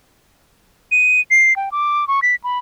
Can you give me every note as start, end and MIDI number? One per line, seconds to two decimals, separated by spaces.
0.92 1.20 99
1.31 1.56 96
1.56 1.69 79
1.72 2.07 86
2.08 2.20 85
2.22 2.35 95
2.44 2.59 83